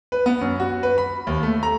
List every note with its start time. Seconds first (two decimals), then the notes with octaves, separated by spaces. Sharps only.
0.12 B4
0.26 B3
0.41 F#2
0.60 F#4
0.83 B4
0.98 B5
1.27 D#2
1.43 A3
1.63 A#5